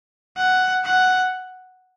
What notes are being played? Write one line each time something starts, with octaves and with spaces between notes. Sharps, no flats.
F#5
F#5